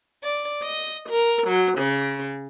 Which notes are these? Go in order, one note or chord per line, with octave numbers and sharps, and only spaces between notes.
D5
D#5
A#4
F#3
C#3